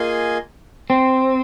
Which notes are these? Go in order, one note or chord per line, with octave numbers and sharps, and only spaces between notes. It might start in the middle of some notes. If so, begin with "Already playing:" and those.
Already playing: A#3 F4 G#4 D#5 G#5
C4